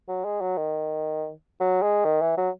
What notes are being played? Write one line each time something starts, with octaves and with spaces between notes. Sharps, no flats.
F#3
G#3
F#3
D#3
F#3
G#3
D#3
E3
F#3